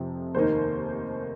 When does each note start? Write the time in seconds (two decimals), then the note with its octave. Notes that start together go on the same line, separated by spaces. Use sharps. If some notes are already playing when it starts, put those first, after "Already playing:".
Already playing: F1 F2 C3 F3 C4
0.35 F1 D#2 D#3 A#3 D#4 C5